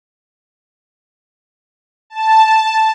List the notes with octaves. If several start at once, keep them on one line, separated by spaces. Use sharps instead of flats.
A5